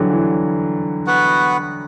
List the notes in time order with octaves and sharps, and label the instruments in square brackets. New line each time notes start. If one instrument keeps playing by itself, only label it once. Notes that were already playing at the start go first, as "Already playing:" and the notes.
Already playing: [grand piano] D3 E3 F#3 G3
E3
[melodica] B3 F#4 B4 F#5